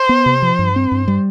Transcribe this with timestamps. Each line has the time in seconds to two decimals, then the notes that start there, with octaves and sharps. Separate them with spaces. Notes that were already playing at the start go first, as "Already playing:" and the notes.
Already playing: C5
0.09 B3
0.26 C3
0.42 F3
0.59 G2
0.76 C4
0.92 G2
1.08 G3